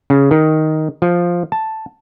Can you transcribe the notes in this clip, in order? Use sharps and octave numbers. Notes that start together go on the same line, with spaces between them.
C#3
D#3
F3
A5